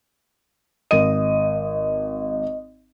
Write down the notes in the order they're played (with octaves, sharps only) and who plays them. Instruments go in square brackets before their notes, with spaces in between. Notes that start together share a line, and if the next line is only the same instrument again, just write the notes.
[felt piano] G#1 D#7 [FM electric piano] D#5